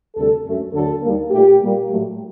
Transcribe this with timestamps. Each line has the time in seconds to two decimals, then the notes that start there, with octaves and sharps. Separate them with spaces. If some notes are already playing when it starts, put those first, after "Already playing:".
0.15 D2 C3 G3 A4
0.45 F#2 F#3 A3
0.74 D2 D3 F#3 A4
1.02 D#2 D#3 G3 A#3
1.31 A#2 A3 G4
1.61 A#2 G3 A#3
1.89 A2 F#3 A3